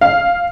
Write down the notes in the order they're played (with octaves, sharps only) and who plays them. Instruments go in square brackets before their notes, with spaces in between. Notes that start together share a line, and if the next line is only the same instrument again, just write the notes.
[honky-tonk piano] F5